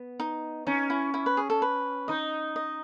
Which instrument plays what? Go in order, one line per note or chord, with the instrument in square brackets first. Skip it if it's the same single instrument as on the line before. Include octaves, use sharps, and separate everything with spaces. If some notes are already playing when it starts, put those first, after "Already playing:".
Already playing: [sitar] B3
[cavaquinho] D#4
[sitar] C#4 [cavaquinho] D#4
[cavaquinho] E4
E4
B4
G#4
A4
B4
[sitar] D#4 [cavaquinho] D#5
[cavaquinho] D#5